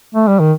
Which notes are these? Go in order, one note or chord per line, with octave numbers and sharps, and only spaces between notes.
A3
G3
D#3